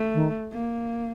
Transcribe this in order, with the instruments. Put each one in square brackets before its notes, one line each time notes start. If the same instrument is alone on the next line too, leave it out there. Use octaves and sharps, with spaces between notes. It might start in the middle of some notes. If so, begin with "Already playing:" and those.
Already playing: [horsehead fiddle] A3
[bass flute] D#3
[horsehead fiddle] A#3